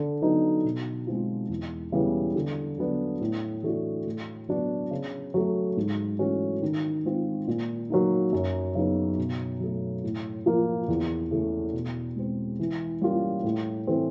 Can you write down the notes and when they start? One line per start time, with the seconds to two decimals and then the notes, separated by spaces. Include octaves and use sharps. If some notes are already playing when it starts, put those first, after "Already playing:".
Already playing: D3
0.22 F#3 B3 D#4
0.64 B2
1.07 G#3 C4 F4
1.49 E2
1.92 C#3 E3 G3 B3
2.36 D3
2.78 F#3 B3 D4
3.21 A2
3.63 E3 A3 D4 F#4
4.06 A2
4.49 F#3 B3 D4 F#4
4.91 C#3
5.34 F#3 A3
5.77 G#2
6.19 E3 A3 C#4 F#4
6.62 D#3
7.05 G#3 C4 F4
7.47 A#2
7.90 F#3 A#3 D#4
8.33 F#2
8.75 C#3 F#3 B3 D#4
9.18 B2
9.60 F#3 A3
10.03 A2
10.46 F3 A#3
10.88 E2
11.31 C#3 E3 A3
11.73 B2
12.16 G#3 C4
12.59 E3
13.02 G3 A#3 C#4 F4
13.44 A2
13.87 E3 A3 C4